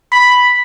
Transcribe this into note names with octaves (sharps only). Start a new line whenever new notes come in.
B5